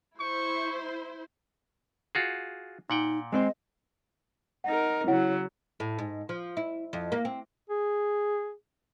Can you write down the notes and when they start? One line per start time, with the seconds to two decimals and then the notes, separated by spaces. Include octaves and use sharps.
0.20 E4 C5 C#6
2.15 F4 F#4 G#4
2.90 A#2 D#4 F#5 G5
3.32 G#3 C4 C5 D#5
4.64 D#4 A#4 F#5
5.07 C#3 F#3 E4 C#5 F#5
5.80 A2
5.99 G#2
6.29 F3
6.57 E4
6.93 F2
7.12 A#3
7.25 C4
7.70 G#4